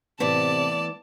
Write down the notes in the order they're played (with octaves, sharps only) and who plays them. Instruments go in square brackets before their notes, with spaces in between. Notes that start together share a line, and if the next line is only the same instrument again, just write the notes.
[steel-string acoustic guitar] A2 E3 B3 [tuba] C3 [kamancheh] D5 [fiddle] A5